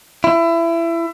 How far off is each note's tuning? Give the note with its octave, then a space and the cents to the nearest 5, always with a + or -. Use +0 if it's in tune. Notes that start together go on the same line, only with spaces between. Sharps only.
E4 +25